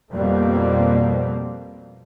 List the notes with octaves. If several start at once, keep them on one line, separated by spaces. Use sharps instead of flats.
F2 B2 G3 A#3 C4